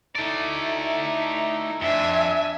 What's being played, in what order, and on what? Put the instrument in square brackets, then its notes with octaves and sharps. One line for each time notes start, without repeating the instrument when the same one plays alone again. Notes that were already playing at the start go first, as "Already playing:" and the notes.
[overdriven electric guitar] A3 D5 [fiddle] D#4 E4
[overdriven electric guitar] F2 [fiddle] D4 G#5 [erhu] E5